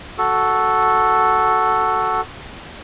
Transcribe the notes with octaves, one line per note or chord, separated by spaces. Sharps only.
F#4 A4